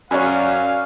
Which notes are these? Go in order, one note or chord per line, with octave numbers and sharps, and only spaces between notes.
F#2 C#5 D5 F5 G#5